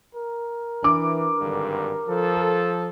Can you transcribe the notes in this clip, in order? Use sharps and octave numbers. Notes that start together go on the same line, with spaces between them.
A#4
E3 D4 D6
G#1 G2 D3
F3 A4